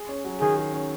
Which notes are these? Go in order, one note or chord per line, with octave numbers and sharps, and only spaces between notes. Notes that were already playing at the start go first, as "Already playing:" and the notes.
Already playing: G#4
C#4
F#3
D#3 G#4
G#4
C#4